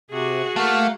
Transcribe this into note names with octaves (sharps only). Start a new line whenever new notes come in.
C3 F#4 G#4
A3 A#3 F5 F#5